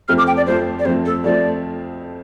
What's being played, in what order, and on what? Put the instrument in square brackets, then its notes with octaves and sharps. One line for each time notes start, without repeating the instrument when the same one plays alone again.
[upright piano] F2 F3 A3 C4 [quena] F6
[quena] D6
G5
D5
[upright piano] F2 F3 A3 C4 [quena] C5
[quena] D5
[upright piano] F2 F3 A3 C4 [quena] C5
[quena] A4
[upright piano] F2 F3 A3 C4 [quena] D5